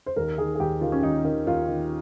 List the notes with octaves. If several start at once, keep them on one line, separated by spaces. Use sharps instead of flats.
C5
D#2 A#4
D#3 G#4
G#4
D#2 G4
D#3 F4
C#4
D#2 D#4
D#3
D#2 F4
D#3